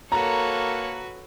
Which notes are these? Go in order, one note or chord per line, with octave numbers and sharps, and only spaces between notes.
A#3 F#4 A4 B4 C#5 A#5